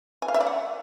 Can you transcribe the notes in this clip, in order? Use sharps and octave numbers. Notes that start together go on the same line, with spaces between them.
G#5
F5
E5
D5
F#5